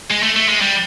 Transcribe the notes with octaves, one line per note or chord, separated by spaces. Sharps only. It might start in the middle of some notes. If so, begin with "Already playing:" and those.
G#3
A3
A3
G#3
G3